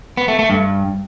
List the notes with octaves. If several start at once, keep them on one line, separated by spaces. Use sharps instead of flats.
B3
A3
A3
G2